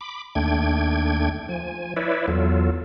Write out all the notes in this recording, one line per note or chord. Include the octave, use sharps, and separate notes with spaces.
B5 D6
D#2 A3 D4 G5 G#6
F3 G#5
E4 B4 C#5 D5 E5
E2 F#3 F4 A4